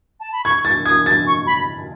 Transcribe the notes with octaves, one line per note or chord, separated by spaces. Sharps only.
A5
B5
C#6 G#6
A6
D#6 G#6
A6
C#6
B5